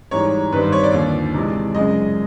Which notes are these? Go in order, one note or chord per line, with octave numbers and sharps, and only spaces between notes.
G#2 E3 G3 C#5
G2 D#3 G3 C4 B4
C5
C#5
D5
D#2 D3 F3
C3 E3 G#3
F#2 C#3 F3 G#3 D#5